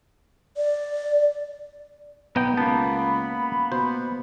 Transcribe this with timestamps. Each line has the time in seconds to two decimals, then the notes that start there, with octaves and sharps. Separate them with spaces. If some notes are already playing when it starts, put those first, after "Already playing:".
0.57 D5
2.36 B1 B3 D#4 G5
2.57 C#2 A#3 B3 A5 B5
3.72 B2 C5